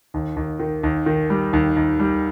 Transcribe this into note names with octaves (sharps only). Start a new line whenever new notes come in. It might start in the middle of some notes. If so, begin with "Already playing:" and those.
D#2
D#2
D#3
D#2
D#3
G3
D#2
D#2
G3